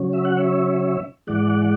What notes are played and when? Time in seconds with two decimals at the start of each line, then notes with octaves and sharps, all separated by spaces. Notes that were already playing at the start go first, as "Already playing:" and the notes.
Already playing: C#3 F#3 C#4
0.13 E5
0.25 F#5
0.37 C#5 E5
1.27 G#2 E3 G#3 D5 F#5